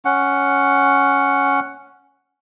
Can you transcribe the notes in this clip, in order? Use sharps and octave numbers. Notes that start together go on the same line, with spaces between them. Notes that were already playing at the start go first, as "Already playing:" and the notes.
C#4 F#5